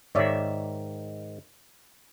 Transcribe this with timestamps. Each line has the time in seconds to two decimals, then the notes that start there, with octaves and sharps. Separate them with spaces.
0.15 G#2 D#3 C#5 D5 E5